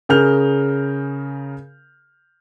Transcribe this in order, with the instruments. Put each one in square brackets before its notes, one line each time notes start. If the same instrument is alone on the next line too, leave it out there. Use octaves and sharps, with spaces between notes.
[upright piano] C#3 G#4 A#4 F6 G6 F7